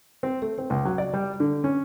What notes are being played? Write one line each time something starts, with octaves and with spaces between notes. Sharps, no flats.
C4
A3
C4
C#2
F#3
D5
G3
D3
C#4